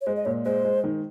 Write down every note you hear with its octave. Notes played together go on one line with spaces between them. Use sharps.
C#5
G#3 C5
D#5
A#2 C#5
G#3 C5
G#3
D#3